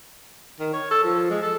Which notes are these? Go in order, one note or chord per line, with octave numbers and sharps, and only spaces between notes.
D#3
C#5
A4
F3
G#3
A4